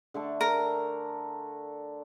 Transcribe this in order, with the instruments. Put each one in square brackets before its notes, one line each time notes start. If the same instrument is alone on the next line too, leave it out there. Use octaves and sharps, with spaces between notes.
[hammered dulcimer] D3 A3 A4
[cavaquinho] A#4